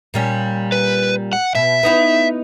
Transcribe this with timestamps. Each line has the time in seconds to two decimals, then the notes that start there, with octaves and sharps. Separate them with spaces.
0.14 A#2 G3 C#4
0.72 B4
1.33 F#5
1.55 B2 E5
1.83 B3 D#4 E4